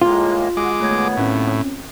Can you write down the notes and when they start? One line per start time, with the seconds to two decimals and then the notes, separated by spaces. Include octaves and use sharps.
0.02 A2 G#3 A#3 F4
0.57 G#3 F#4 D6
0.80 D#2 A3 B3 C#5 G#6
1.17 A2 C4 C#4